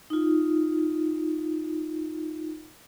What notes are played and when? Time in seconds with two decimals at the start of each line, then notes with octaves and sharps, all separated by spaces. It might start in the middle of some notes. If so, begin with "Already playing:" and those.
0.10 D#4 F4